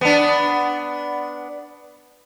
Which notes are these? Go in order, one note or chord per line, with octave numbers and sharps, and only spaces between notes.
B3 D4